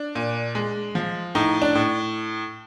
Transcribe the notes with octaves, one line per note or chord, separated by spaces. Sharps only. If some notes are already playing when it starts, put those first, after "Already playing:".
Already playing: D4
A#2
G#3
F3
A2 D#4
D4
A2